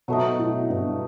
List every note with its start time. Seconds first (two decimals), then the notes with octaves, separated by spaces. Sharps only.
0.08 B2 F#3 A3 D#4
0.39 A2
0.70 G2